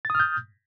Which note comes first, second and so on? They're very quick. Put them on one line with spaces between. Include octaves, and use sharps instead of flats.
A6 D#6 F6 G6